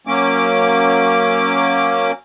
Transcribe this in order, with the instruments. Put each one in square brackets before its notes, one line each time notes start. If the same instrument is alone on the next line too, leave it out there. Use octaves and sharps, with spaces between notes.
[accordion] F#3 A#3 C#4 D6